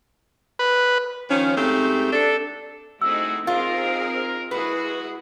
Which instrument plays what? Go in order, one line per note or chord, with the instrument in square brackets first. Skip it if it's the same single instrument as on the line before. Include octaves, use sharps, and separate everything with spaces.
[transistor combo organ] B4
[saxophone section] D#3 F3 C#4
G#2 A3 C4 G4
D4 A4
[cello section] A3 C4 D#4 [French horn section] E4 F#4 G#4 [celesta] E6
[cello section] C4 D#4 G#4 [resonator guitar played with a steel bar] F4 [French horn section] A#4
[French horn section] G#3 F#4 [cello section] E4 G#4 [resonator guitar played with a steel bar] B4